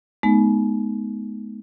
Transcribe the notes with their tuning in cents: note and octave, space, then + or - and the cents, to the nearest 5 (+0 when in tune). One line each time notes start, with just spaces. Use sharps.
G#3 +40 B3 -10 D#4 +0